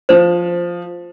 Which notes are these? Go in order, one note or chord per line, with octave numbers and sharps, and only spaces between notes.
F3 C5 E7